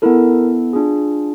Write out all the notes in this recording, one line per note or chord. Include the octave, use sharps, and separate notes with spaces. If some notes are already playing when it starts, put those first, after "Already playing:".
B3 E4 A4 A#4
D4 F4 G#4